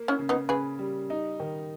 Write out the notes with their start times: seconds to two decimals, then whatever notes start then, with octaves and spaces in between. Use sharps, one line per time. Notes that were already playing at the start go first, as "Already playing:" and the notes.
Already playing: A#3
0.08 C#4 E4
0.19 C#3
0.29 B3 D#4
0.49 C#3 G#4 B4
0.79 G3
1.10 D#4
1.40 D#3